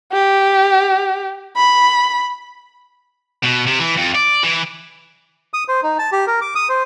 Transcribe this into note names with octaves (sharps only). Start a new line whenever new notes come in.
G4
B5
B2
C3
E3
F2
D5
E3
D#6
C5
D#4
A5
G4
A#4
D6
D#6
C5